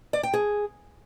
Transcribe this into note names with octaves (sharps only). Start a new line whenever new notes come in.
D5
G5
G#4